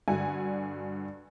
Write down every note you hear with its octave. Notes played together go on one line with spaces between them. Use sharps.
G2 D3 F#4 F#5 G#5